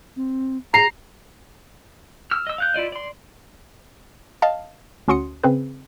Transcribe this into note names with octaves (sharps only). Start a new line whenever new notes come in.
C4
G#4 A#5 C7
E6 F6
D#5 E6
F5 F#6 G6
E4 F4 D5 D#5
D5 C6
D#5 F5 A5
D2 C#4 F#4 C6 D#6 C#7
C#3 C4 G#4 B4